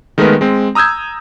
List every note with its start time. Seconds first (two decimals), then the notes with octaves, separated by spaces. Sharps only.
0.18 D#3 G#3 A3 B3 A#4 B4
0.41 G#3 C4
0.75 A#5 D#6 E6 G6 G#6